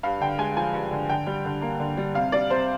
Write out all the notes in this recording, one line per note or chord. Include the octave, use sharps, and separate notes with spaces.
G2 F5
D3 G5
G#3 G#5
F3 G#5
G2
D3
D3 G5
G3
D3
A#3
D3
G3
C3 F5
G3 D5
C3 C5